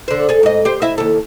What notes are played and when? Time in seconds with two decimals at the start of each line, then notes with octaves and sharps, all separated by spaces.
0.08 D3 C5
0.29 G#4 A4
0.43 G#2 D#5
0.65 G4 C5
0.82 E4 D#5 E5
0.98 D#2 A4